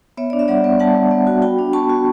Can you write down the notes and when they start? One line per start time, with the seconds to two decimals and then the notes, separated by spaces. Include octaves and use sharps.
0.17 B3 C#5 E5
0.30 D4 D5
0.39 E5
0.48 G3 D5 F#5
0.64 B3
0.80 G3 F#5 A5
0.95 G3
1.11 B3
1.27 F#4
1.42 F#4 G5 B5
1.59 D4
1.73 B3 A5 C#6
1.90 F#4